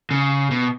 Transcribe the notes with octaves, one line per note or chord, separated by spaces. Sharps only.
C#3
B2